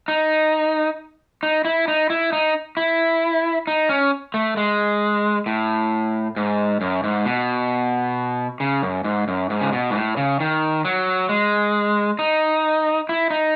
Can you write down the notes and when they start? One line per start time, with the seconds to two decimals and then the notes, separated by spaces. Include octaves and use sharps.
0.08 D#4
1.43 D#4
1.65 E4
1.88 D#4
2.10 E4
2.33 D#4
2.77 E4
3.67 D#4
3.89 C#4
4.34 A3
4.57 G#3
5.46 A2
6.36 G#2
6.81 F#2
7.04 G#2
7.25 B2
8.60 C#3
8.82 F#2
9.04 G#2
9.28 F#2
9.50 G#2
9.61 C#3
9.73 B2
9.90 G#2
9.95 A2
10.17 C#3
10.40 D#3
10.85 F#3
11.29 G#3
12.19 D#4
13.09 E4
13.30 D#4